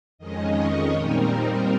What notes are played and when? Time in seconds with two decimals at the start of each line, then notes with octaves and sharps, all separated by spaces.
0.18 F2 D#3 G#3 C#4 D#5
0.55 C#5
0.91 A#2 G3 C4 D#4 A#4